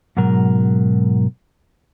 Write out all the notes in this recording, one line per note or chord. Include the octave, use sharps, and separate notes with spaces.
G#2 B2 F#3 A#4